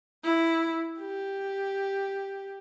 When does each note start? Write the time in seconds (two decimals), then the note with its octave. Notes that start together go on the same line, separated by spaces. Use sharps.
0.24 E4
1.00 G4